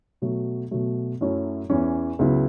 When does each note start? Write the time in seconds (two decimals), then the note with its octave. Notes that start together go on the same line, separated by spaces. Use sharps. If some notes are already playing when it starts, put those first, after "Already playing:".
0.22 B2 F#3 A3
0.71 B2 F#3 A3
1.21 F#2 F#3 A3 C#4 E4
1.70 E2 E3 C#4
2.19 C#2 C#3 F#3 B3 E4